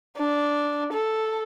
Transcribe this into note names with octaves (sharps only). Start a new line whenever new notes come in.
D4
A4